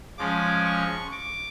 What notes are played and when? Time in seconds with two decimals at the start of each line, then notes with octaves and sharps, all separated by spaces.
0.18 F3 G#3 C#4 D6
0.65 C#6
1.12 D6